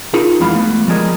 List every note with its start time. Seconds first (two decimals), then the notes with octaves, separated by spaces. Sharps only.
0.14 D#4 F4 G#4 A#4
0.40 F2 E3 G#3 B3 F5 B5
0.56 A3 B3
0.88 F3 G3 G#3 G#4 A#4 D#5